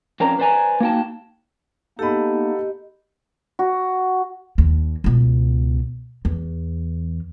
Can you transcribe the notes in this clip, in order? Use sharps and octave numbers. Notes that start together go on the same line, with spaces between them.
F2 C4 C#4 A#4 D5 A#5
B4 C5 D5 G5 G#5 A#5
A#3 D#4 F#4 F#5 G5 A5
A#3 B3 D#4 G4 A4 D#5 B5
F#4
D#2
C#2 B2
E2